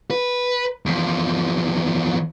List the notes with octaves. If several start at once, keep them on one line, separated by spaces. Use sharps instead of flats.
B4
E2 F3